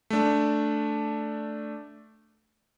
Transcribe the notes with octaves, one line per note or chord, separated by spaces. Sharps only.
A3 D4